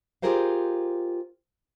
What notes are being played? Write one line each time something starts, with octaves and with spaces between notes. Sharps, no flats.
F4 G4 G#4 A#4 C5 F5